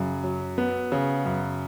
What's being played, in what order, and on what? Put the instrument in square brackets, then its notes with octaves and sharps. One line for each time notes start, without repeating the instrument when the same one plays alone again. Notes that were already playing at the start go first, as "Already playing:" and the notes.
Already playing: [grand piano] F#2 C#3
F#3
B3
C#3
F#2